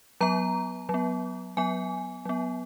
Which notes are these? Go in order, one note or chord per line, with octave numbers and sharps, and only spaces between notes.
F#3 B3 A#5
F#3
B3
F#3 B3 G#5
F#3 B3